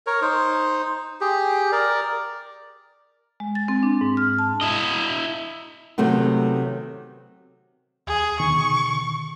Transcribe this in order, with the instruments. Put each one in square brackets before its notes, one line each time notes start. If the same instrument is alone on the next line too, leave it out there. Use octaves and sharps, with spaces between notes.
[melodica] A#4 C#5
D#4 C5
G4 G#4
A#4 D5
[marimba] G#3
A6
C4
D4
G#2
F6
A5
[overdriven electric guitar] E4 D#5
[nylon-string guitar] C3 D#3 F#3 A3 B3
[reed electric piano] D#2 [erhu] G#4
[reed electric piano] B2 D3 D#3 [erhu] C#6